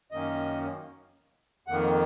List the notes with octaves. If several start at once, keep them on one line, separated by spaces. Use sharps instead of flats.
F#2 D#3 A#3 C#4 D#5
F2 D#3 A#3 F#5